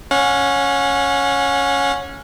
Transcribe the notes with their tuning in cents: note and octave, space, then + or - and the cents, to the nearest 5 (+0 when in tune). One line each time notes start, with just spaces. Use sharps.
C#4 +0 F#5 -40